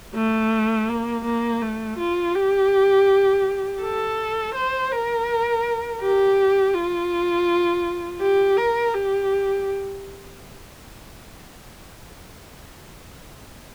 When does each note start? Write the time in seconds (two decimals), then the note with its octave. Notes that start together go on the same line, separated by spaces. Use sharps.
0.15 A3
0.89 A#3
1.25 A#3
1.62 A3
1.99 F4
2.35 G4
3.81 A4
4.55 C5
4.91 A#4
6.01 G4
6.75 F4
8.21 G4
8.57 A#4
8.94 G4